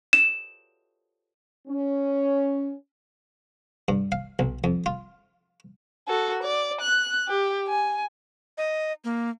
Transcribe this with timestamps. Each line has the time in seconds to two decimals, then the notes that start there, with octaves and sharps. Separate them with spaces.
0.13 E7
1.68 C#4
3.88 G2
4.12 F5
4.39 B1
4.64 F2
4.86 F4
6.08 F#4 A4
6.43 D5
6.81 F#6
7.28 G4
7.68 G#5
8.58 D#5
9.04 A#3